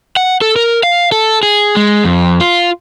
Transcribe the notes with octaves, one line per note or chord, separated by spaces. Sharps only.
F#5
A4
A#4
F5
A4
G#4
G#3
F2
F4